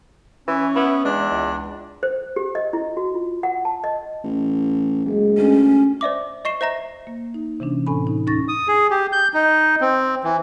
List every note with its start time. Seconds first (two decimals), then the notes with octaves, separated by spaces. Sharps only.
0.48 E3 C#4
0.76 B3 E4
1.05 E2 G#3 D4
1.31 C#2
2.03 C5
2.36 G4
2.55 D#5
2.73 E4
2.97 F#4
3.14 F4
3.43 F#5
3.65 A5
3.84 D#5
4.24 A1
5.06 F#1 G#3
5.37 D2 C#4
6.01 C5 D5 E5 D6
6.45 D#5 C#6 C7 E7
6.61 C5 E5 A#5 A#6
7.07 A#3
7.34 D#4
7.60 C3 E3 C#4 D4
7.87 A2 C4 D4 G#5 B5
8.07 D#4
8.27 D#2 C#4 D#4 C#6 A6 A#6
8.48 D#6
8.68 G#4
8.91 G4
9.12 G6
9.34 D#4
9.81 C4
10.24 E3